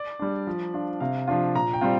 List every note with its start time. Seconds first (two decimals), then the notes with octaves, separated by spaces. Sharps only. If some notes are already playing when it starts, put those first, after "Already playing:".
Already playing: D5
0.19 G3 D4
0.47 F3
0.74 D4 F4
1.00 C3 F5
1.28 F3 D4 F4
1.55 A#2 A#5
1.73 G5
1.81 G3 C4 F4